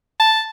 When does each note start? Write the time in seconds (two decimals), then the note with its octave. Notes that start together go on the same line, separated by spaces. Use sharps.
0.20 A5